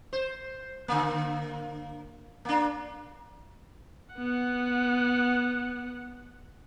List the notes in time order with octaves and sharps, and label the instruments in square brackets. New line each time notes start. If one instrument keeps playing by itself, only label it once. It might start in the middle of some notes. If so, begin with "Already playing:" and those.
[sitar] C5
D3 A#3
A#3 D4
[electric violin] B3 F#5